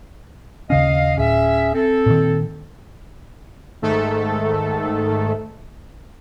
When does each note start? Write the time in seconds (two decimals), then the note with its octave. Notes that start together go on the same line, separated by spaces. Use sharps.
0.70 D#2 C#3 C#4 D#5 F5
1.18 D1 C#4 G#4 E5
1.74 C4 A4
2.06 A#2 D#3
3.82 G#2 D#3 A3 A4